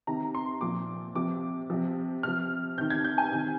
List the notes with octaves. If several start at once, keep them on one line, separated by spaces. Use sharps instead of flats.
C3 D#3 A#5
C6
A#2 F3 D6
C3 F3 D6
C3 F3
C3 F3 F6
C3 D#3 G6
G#6
G6
G#5
C3 D#3